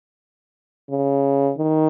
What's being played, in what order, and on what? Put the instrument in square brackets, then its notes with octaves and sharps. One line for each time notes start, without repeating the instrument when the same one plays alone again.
[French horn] C#3
D#3